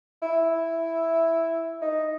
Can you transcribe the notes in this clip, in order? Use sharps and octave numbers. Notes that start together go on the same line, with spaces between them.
E4
D#4